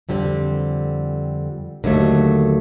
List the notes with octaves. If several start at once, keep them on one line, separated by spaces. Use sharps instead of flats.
F2 D3 G3 C4
D#2 D3 F#3 A3